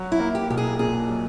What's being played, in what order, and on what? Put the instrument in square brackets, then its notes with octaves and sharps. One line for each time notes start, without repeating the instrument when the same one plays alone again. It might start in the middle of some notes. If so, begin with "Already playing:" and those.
Already playing: [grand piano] F#3
[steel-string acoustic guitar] E4
[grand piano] A#3
[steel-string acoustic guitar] G4
[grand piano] B1 [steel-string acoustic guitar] G4
[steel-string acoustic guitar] G#4
[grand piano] A#2 [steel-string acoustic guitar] G#4
[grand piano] F#3